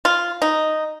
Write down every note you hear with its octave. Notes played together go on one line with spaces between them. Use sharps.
F4
D#4